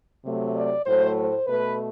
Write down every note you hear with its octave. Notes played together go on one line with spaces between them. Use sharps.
C3 F#3 A3
D5
A2 F#3 A3 C5
C5
B2 A3 B4